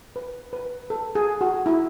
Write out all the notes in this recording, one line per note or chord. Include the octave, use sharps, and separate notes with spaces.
B4
B4
A4
G#4
F#4
E4